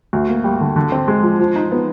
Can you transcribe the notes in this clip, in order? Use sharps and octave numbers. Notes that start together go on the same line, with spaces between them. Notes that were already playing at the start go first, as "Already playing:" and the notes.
D2
A#3
G3
D3
D3
C4
G#3
F3
F3
D#4
B3